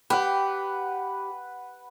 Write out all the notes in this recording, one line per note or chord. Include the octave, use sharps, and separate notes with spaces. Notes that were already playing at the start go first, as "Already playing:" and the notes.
G4 B4 F#5